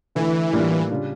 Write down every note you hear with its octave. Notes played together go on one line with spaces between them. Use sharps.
D3 E3 A3 E4
A2 G3 A#3 D4 F4
C#3 G3 D4 F4